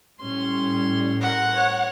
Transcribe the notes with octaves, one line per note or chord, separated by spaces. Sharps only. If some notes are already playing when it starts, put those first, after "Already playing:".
A2 G3 C#4 C6
A#4 F#5
C#5